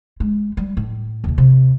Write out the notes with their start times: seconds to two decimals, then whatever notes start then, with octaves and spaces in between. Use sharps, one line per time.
0.20 G#3
0.57 G3
0.77 A2
1.24 D#2 B2
1.38 C3